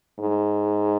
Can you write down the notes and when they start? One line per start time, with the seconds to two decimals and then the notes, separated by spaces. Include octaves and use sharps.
0.19 G#2